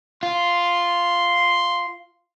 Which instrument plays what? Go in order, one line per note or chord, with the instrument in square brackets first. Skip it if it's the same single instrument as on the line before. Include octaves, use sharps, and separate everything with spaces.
[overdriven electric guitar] F4 [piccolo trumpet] C6